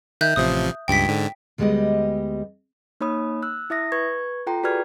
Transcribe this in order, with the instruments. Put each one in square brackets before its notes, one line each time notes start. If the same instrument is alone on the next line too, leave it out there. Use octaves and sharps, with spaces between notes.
[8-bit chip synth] D#3 [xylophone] E5 F#6 G6
[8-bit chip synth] A1 C3 F3 [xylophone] D#6
[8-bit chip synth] C#2 G2 [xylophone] G5 B6
[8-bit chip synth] G#2 D3
[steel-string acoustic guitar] D2 G3 G#3 B3 G4 D#5
[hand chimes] A#3 D#4 C#5 B5 D#6
E6 F#6
E4 E5 D#6 A#6
B4 C#6 G#6
F4 A4 G5 A#5 C6
F#4 G#4 B4 D5 F6 G#6